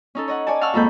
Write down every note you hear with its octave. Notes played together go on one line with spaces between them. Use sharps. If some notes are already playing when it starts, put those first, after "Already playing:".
C#4 D#4 A4
C#5 D#5 F#5
C#5 D5 G#5 A5
F5 F#5 A5 C#6 E6 F6
F2 G#2 A#3 A4 B5 G6